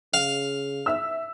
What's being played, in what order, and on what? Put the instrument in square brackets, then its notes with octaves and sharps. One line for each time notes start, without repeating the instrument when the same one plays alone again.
[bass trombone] C#3 [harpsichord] F5
[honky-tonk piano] E5 E6